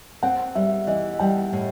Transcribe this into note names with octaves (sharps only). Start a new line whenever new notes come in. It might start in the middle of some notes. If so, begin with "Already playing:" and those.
C4 F#5
G3 E5
E3 D#5
G3 G5
A2